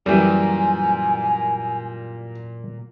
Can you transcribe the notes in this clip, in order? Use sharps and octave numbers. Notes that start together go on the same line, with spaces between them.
F#2 A#2 E3 G3 G#5